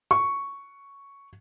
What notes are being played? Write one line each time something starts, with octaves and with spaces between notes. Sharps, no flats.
C#6